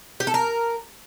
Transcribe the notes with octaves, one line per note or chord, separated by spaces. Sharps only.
G4
A4
A#4